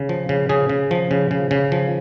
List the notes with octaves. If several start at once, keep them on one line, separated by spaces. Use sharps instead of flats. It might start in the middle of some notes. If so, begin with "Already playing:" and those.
Already playing: C#3
F3
C#3
C#3 G#4
C#3
F3
C#3
C#3
C#3
F3